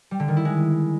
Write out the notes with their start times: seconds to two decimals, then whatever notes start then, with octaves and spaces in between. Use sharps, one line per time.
0.11 G3
0.20 D3
0.28 D#3
0.37 E4
0.45 G#3